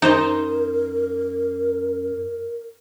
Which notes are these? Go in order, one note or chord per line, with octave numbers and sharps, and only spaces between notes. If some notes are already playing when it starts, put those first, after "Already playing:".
F#2 D#4 A#4 C5 D#5